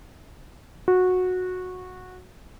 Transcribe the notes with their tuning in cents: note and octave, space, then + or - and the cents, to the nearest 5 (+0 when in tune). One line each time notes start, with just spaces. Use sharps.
F#4 -15